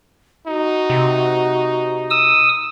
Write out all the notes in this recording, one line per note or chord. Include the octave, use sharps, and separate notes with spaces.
D#4 F#4
C3
D#6 E6